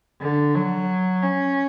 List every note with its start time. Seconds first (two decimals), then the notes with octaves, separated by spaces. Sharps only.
0.20 D3
0.55 F#3
1.22 C#4